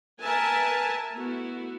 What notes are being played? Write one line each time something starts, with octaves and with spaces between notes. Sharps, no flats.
A#4 B4 E5 G#5 A5
A3 B3 E4 F#4